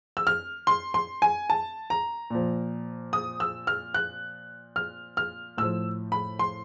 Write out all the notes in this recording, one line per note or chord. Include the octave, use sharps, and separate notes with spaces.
E6
F6
C6
C6
G#5
A5
A#5
A#2 F3
D#6
E6
F6
F#6
F6
F6
A2 F3 E6
B5
C6